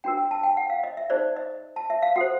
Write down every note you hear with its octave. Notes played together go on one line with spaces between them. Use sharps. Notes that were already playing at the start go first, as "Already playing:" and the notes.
D4 F#4 A#4 G5
G5
A5
G5
F#5
F5
D#5
E5
D#4 G#4 C5 D5
D#5
A5
E5
F5
F#4 A4 C5 F#5